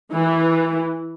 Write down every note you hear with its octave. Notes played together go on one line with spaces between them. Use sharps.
E3